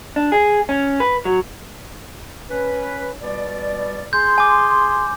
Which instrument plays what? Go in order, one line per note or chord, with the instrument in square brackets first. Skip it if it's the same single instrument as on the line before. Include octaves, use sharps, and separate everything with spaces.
[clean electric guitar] D4
G#4
C#4
B4
F#3
[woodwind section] C#4 B4
B2 G3 D5
[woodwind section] G#4 C6 [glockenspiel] G6
[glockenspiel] G#5 D6